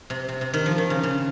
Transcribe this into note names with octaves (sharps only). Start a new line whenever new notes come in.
C3
C3
C3
D#3
F3
D#3
C#3
C#3